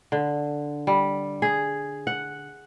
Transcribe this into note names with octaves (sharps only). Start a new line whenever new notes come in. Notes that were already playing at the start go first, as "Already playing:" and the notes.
D3
G3
G#4
F#5